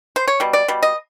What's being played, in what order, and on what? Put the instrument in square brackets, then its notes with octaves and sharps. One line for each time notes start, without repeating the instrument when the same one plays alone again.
[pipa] C5
C#5
B2 G3
D5
B2 G3
D#5